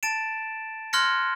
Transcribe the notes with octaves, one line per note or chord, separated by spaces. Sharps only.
A5 A6 D7 E7
C6 F6 F#6 G#6 A#6 C#7